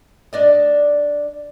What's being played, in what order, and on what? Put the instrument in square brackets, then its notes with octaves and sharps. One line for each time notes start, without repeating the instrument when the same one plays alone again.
[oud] D4 D5 D#5